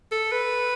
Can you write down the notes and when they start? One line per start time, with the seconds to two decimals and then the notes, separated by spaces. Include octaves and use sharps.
0.12 A4
0.32 B4